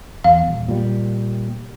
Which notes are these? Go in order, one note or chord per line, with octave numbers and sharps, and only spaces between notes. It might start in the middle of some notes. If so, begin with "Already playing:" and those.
E2 F5
D#1
A#2 G3